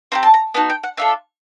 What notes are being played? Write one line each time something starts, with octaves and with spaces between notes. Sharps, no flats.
C4 E4 G4 A#5
A5
A#5
B3 D#4 F#4 A5
G5
F#5
D4 F4 A4 E5